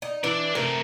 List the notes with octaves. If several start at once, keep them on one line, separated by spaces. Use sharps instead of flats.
D#4
E3 D4 D5
C3 A3 A#4